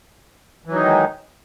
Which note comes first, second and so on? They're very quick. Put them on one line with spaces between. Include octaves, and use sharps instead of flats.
E3 F#3 D#4 D#3 G#3